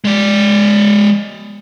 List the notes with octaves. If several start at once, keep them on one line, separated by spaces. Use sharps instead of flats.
G#3 D5